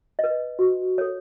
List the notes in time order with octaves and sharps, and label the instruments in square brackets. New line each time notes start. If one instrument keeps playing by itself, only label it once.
[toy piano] B4 D#5
F#4
A4 C#5